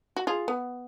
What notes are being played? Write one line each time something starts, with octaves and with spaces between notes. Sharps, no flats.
F#4
F4 G#4
B3